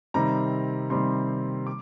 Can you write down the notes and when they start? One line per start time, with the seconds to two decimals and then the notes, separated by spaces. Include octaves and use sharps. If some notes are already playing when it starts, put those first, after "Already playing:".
0.14 C3 D#3 G3 C4 A#5
0.90 C3 D#3 G3 C4 C6
1.67 D6